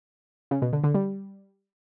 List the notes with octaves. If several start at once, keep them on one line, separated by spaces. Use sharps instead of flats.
C#3
B2
D3
D3
G3